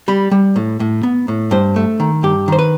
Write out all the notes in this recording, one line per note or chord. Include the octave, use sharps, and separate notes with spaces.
G3 B5
G3
A2
A2
B3
A2
G2 C5
A3
D#3
G2 G4
D#3 C5
B4